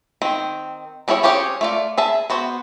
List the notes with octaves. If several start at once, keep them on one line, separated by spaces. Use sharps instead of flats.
D#3 C4
G3 D4 E4 G#4 C#5
C4 C#4 G4 G#4 C#5
A3 F4 D5
G#4 E5 A5
B3 F#4 C5